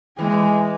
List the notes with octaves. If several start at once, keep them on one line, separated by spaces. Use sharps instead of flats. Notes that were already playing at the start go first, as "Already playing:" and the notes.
E3 G#3